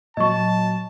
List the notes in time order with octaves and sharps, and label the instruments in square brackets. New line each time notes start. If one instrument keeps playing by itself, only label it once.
[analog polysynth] A#2 F#3 [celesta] D#5 C#6 [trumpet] A5